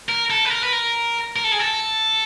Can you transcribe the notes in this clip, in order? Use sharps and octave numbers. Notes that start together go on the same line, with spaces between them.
A#4
A4
B4
A#4
B4
A#4
A#4
A4
G#4
A4